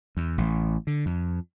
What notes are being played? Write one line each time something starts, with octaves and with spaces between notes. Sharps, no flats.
E2
A1
D3
F2